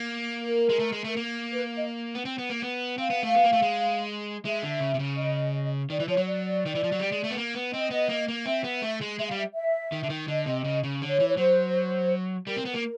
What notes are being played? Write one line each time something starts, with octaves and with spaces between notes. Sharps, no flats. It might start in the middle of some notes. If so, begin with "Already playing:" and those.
Already playing: A#3
A#4
G#3
A3
G#3
A3
A#3
B4
D#5
B3
C4
B3
A#3
B3
C4 F5
B3
A3
B3
A#3
A3
G#3
G#3 E5
D3
C#3
C3
C#3
D#5
D#3 D5
E3
F3 C#5
F#3
D5
D#3
E3
F3
F#3
G3
G#3
A3
B3
A#3
B3
C4 D#5
B3
A#3
A#3
C4 E5
B3
A3
G#3
G#3 E5
F5
G3
E5
E5
D#3
D3
D#3
D3 D#5
C3
C#3
C#3
D3 C#5
E3
C#5
F#3 C5
G3 A#4
C4
B3
A#3